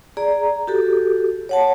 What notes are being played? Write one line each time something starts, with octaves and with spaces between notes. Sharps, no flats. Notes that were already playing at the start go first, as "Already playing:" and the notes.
G#4 D5 A#5
F#4 G4 A4
C#5 F#5 A5